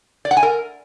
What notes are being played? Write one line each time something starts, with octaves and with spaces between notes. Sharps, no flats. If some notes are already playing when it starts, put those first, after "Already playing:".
D5
F#5
G#5
A#4